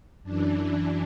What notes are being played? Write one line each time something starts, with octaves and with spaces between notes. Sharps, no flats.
F#2 E3 D4